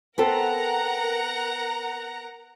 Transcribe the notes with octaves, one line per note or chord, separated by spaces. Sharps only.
B3 C4 A4 A#4 F#5 A#5